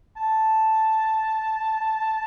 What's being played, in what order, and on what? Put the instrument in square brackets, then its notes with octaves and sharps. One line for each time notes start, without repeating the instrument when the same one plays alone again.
[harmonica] A5